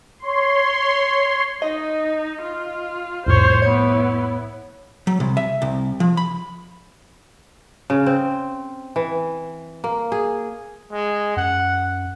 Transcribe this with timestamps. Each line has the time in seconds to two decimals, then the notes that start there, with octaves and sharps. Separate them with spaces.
0.19 C#5 C6
1.62 D#4 D#5
2.41 F4
3.26 C2 F2 A2 C5 C#5
3.62 B3 E4 C#5
5.07 F#3
5.20 C2
5.37 E5
5.62 C2
6.00 F3
6.17 B5
7.90 C#3
8.06 C4
8.96 E3
9.84 A#3
10.12 G#4
10.92 G#3
11.36 F#2 F#5